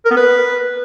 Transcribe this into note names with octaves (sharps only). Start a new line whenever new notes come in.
A#4
B3
B4